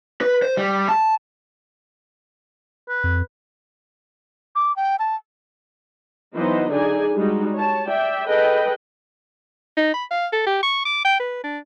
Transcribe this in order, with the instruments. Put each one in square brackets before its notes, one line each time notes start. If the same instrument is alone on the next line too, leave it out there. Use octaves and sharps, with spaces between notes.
[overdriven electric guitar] B4
C5
G3
A5
[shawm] B4
[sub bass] F2
[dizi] D6
G5
A5
[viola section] E3 F#3 B3 D#4 C5 D#5
D3 D#4 G#4 D5 G#5
G3 G#3 D#4 F#4
C#5 A5
D5 E5 G5
G#4 A4 B4 D#5 G5
[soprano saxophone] D#4
B5
F5
A4
G4
C#6
D6
G5
B4
D4